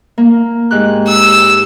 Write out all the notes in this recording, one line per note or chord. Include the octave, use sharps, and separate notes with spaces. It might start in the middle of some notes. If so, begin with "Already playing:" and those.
A#3
G#2 G4 F#6
E6